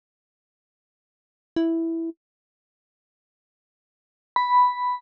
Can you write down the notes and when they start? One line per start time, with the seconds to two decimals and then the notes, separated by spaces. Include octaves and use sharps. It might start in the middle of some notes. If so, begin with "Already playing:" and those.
1.56 E4
4.36 B5